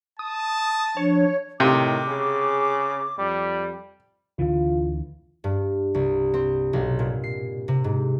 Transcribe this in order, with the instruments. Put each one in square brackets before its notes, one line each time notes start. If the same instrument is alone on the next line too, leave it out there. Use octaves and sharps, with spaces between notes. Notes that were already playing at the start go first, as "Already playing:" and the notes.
[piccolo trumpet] A5 [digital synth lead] D#6
[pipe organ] F3 D4 [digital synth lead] C#5
[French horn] A2 [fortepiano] C3 [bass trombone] D#3 [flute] D6
[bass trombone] C#3 [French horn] G#4
[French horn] F2 [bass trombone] G3
[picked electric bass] D2 D3 E3 [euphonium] F4
[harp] G2
C2
C4
B1
A#2
C7
C3
G#2